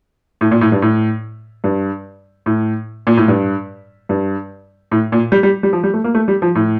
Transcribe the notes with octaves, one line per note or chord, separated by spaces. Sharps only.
A2
A#2
A2
G2
A2
G2
A2
A#2
A2
G2
G2
A2
A#2
G3
G3
G3
F3
G3
A3
A#3
A3
G3
F3
A2